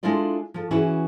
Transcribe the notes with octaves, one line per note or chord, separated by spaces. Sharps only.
G#3 D4 E4 F4 A4 D5
F3 A4
E3 C#4 E4 F#4 G#4 B4